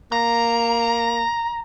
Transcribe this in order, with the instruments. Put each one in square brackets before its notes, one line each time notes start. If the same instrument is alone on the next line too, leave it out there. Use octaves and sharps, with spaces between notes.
[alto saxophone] A#3 [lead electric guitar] A#5